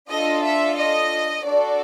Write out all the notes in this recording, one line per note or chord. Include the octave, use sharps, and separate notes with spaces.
D4 F4 A4 D#5
E5
D#5
D4 F#4 A4 D5